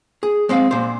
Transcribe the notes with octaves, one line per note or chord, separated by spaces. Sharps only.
G#4
G#3 C4 F5
A#2 C5